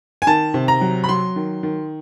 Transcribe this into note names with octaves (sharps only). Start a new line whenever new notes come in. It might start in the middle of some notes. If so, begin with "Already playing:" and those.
G#5
D#3 A5
C3
A#5
F#3
B5
F#3 C6
D#3
D#3